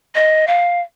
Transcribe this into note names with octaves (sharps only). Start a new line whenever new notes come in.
D#5
F5